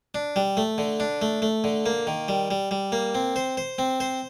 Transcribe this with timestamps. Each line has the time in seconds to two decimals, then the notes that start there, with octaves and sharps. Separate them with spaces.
0.15 D4
0.36 G3
0.57 A3
0.78 D3
1.00 D4
1.22 A3
1.42 A3
1.64 D3
1.86 A#3
2.07 D#3
2.28 G3
2.51 G3
2.71 G3
2.92 A#3
3.15 C4
3.36 C5
3.57 C5
3.78 C4
4.00 C5